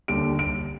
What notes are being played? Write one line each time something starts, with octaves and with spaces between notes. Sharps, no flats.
D#2 D3 G3 D7
D7